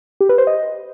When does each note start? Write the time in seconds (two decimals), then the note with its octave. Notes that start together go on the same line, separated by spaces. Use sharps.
0.21 G4
0.29 B4
0.38 C5
0.47 D#5